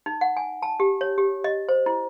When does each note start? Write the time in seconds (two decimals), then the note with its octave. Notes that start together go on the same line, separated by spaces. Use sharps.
0.06 D#4
0.21 F#5
0.37 G#5
0.62 A5
0.80 G4
1.01 C#5
1.18 G4
1.44 D#5
1.69 C5
1.86 E4